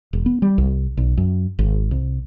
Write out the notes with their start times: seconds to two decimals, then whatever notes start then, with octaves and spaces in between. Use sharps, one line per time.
0.13 E1
0.26 B3
0.42 G3
0.58 C2
0.97 B1
1.17 F#2
1.59 G#1
1.91 C2